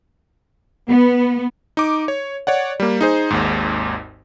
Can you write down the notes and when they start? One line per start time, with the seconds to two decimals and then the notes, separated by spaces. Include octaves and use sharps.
0.88 B3
1.77 D#4 D6
2.08 C#5
2.47 C#5 D5 F#5
2.80 G3 A#3
3.01 D#4 G#4 C5
3.31 G#1 D#2 G#2